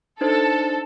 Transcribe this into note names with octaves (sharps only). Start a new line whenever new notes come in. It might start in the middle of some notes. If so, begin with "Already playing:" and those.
D4 D#4 A4 C5